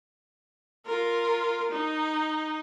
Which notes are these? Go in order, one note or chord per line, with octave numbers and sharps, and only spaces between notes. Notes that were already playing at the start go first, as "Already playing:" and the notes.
F4 A#4
D#4